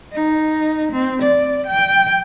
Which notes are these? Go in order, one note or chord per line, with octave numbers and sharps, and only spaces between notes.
D#4
C4
D5
G5